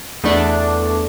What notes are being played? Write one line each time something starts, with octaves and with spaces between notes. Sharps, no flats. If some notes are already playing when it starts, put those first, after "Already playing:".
E2 A3 D4